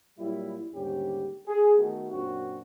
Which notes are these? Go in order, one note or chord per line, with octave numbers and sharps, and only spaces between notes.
A#2 F#3 G3 E4
D#2 G#2 D3 G3 C#4 G4
G#4
D#3 A3 B3 F#4
F#2 A#2 C4 D4 F#4